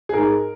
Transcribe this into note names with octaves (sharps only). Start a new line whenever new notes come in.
G#4
G#2 A#4